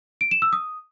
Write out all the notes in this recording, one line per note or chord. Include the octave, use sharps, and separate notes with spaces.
D7
E7
E6
D#6